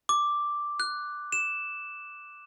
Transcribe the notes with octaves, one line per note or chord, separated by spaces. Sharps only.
D6
F#6
E7